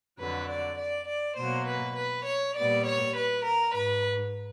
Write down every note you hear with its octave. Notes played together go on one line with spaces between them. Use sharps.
F2 D3 F#3 B4
D5
D5
D5
B2 F#3 A#3 C5
B4
B4
C#5
A#2 G3 B3 D5
C#5
B4
A#4
G#2 B4